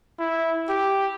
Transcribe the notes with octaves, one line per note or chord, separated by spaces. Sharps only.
E4
G4